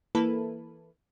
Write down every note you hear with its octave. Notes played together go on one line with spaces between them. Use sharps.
E3 A#3 E4 A4 B4